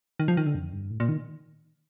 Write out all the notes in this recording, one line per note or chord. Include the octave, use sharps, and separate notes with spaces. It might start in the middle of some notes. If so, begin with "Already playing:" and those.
D#3
F3
D#3
D3
F2
G2
A2
A#2
D#3